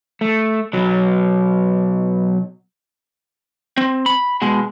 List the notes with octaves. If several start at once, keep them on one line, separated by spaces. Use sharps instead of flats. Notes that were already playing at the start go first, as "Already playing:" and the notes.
A3
B1 F#3
C4
B5
B2 G#3